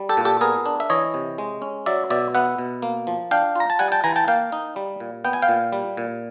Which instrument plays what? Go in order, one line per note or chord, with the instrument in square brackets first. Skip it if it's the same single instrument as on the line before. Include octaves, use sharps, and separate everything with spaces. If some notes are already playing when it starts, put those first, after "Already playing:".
Already playing: [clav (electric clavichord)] G3
G4 A4
A#2
G4 A4
B3 G#4 A#4
D4
E5
E3 C#5 D#5
C3
G#3
C#4
F#3 D5 E5
B2 D5 E5
B3 E5 F#5
B2
A#3
F3
D4 F5 G5
F4 A#5
A5
G3 F#5 G#5
G5 A5
E3 G#5 A#5
G5 A5
A#3 F5 G5
D#4
G3
A#2
B3 G5
G#5
F5 G5
A#2
G3
A#2